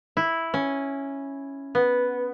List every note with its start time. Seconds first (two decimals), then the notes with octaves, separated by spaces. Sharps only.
0.17 E4
0.54 C#4
1.75 B3